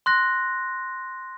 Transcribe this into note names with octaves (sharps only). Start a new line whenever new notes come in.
C6 F#6 A#6